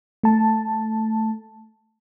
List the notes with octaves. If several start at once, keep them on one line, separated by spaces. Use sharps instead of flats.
A3 A5